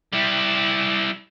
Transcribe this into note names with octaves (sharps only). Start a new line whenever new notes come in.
G3 E4